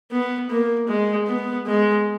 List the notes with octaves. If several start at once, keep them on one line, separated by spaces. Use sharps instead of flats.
B3
A#3
G#3
B3
G#3